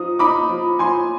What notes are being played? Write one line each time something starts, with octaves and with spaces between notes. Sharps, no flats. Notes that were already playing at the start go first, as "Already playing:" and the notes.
Already playing: F3 D#4 D#6
D#4 B5 D6
F3
F3 G#5 C6